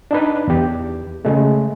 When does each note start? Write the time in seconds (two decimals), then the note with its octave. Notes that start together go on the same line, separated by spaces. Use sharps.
0.11 D4 D#4 B4
0.48 E2 G4
1.25 C#3 G#3 A3